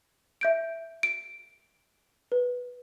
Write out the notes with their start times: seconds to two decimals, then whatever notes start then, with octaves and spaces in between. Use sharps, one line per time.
0.41 E5 G6 D7
1.03 D7
2.32 B4